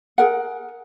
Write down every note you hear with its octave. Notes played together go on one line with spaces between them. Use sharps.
G#4 A#4 F#5